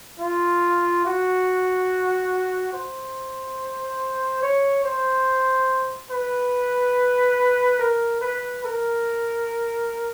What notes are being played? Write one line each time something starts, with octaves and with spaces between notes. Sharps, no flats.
F4
F#4
C5
C#5
C5
B4
A#4
B4
A#4